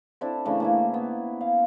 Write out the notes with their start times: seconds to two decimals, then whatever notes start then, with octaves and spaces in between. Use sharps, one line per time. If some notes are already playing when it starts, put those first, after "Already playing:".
0.21 C4 D4 E4 A4
0.45 C#3 E3 A3 D4
0.60 A#3 C#4 E4
0.94 B3
1.41 F5